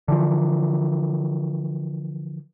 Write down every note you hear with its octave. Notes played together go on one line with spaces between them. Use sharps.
D3 E3 F3